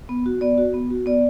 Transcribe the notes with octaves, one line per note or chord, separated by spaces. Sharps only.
B3
F#4
B3 D5
F#4
B3
F#4
B3 D5